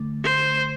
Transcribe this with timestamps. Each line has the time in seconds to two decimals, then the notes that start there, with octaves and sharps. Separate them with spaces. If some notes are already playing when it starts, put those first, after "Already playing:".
Already playing: D3 A3
0.24 C5